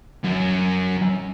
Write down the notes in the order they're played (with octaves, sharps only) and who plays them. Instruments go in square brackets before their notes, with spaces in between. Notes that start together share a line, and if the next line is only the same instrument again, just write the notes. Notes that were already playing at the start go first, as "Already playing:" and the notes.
[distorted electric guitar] F#2